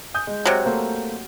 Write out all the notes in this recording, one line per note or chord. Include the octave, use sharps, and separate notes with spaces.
G#5 D#6 G6
G#3
C3 F#3
A3 A#3 C5